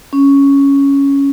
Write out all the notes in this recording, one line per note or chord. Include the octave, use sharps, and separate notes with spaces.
C#4